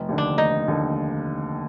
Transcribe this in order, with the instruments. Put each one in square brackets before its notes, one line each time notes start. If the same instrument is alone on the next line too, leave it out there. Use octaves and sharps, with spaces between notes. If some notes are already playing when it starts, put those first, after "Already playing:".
Already playing: [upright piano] F1
D#2 D3
[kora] D4
[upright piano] F1 [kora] D#4
[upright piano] D#2 D3